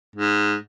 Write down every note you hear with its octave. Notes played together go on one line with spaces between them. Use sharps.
G#2